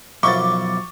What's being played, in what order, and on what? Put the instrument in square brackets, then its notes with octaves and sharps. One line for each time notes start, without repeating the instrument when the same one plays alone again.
[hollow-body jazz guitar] B1 [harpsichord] F#2 F3 E4 [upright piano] C#6 A6 [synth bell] D6